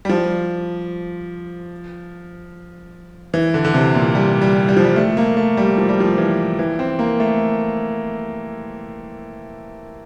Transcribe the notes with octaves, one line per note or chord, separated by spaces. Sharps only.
G3
F3
E3
D3
D3
C3
A#2
G3
G3
G3
F3
G3
A3
A#3
A3
G3
F3
G3
F3
E3
E3
C4
A#3
A3